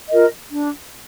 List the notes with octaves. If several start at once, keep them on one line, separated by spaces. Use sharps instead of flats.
F4 A#4 D#5
D4